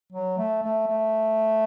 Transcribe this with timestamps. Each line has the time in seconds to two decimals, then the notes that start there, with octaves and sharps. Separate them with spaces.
0.12 F#3
0.38 A3
0.62 A3
0.87 A3